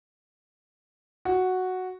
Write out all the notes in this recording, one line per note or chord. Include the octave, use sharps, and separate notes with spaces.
F#4